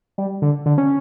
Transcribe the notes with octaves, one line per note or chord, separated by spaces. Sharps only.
G3
D3
D3
C#4